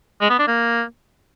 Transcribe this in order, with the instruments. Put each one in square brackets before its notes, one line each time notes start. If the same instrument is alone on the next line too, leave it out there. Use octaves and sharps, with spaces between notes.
[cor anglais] G#3
B3
D4
A#3